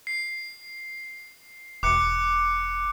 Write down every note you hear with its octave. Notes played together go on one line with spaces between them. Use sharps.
C7
E1 D6 F#6 C#7